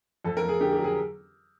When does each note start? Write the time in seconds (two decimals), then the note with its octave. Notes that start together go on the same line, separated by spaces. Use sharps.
0.25 F2 A4
0.37 A#4
0.43 F2
0.49 G#4
0.60 D3 G4
0.72 G4
0.78 F#3
0.84 G#4